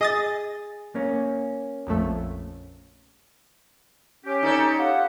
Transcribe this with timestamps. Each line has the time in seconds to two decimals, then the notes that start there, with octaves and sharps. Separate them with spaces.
0.01 G#4 D#5 D#6 A6
0.95 A#3 C#4
1.87 A#1 F2 A3
4.25 C#4 G4
4.43 D#4 A4 C#5
4.78 F4 G4 F#5